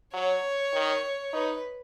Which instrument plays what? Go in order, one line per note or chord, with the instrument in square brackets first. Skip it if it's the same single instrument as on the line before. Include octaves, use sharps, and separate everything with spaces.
[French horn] F#3 [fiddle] C#5
[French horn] D#3
[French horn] D#4 [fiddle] B4